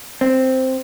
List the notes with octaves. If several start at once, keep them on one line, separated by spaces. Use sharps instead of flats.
C4